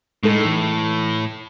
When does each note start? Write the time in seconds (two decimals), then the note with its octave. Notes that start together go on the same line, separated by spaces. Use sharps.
0.23 A2 G#3 D#4 A4
0.45 E3